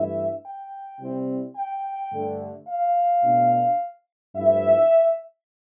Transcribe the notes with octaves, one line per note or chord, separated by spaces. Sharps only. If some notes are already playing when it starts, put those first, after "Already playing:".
Already playing: G2 E3 A3 E4 E5
G5
C3 G3 C4 E4
G5
G2 D3 A3
F5
B2 A3 D4
G2 F3 A3 E4 E5